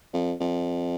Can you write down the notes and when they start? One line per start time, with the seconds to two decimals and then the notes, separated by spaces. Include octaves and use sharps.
0.13 F2
0.40 F2